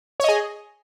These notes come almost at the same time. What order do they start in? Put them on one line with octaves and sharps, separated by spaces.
C#5 D#5 G#4